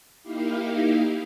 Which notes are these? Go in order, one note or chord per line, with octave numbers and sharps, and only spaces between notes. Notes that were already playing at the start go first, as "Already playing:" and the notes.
A#3 D#4 E4 G4 F5